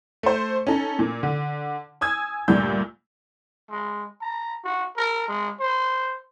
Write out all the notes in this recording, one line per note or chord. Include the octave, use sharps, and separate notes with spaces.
A3 C5
C#4 D#4 A4
A#2
D3
G#5 D#6 E6 G#6
D2 G2 A#2 D4 E6 G6
G#3
A#5
F#4
A#4
G#3
C5